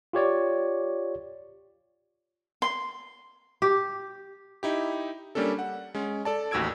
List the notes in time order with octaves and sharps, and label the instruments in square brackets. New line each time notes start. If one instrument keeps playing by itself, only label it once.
[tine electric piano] F4 G4 C#5 D5
[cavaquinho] C6
[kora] G4
[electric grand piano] D#4 E4 G4
G3 A#3 C#4 D4 A4
F#5
G#3 C#4
A4 D5 A5
A1 D#2 F#4 E6 G#6 D7